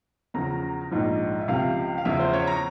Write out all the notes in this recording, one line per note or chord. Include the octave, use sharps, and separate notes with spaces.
E2 C#3 F3 A#5
A#1 G#2 F3
E5
C#2 C3 F3 F5
F5
E2 C#3 F3 E5
C5
C#5
A#5